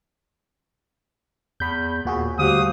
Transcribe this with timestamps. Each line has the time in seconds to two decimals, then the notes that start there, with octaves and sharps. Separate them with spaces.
1.60 E2 B5 G6
2.05 D#2 A#2 F#4 G#4
2.39 D2 G3 F#4 G4 C5 F5 F#5 D#6